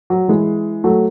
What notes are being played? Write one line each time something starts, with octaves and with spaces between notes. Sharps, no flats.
F#3
E3 G#3
F#3 A3